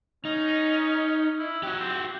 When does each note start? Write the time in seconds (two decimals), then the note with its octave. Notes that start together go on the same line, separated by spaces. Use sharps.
0.25 C#4 D#4
1.39 E4
1.63 F#3 F#4 G4
1.80 C4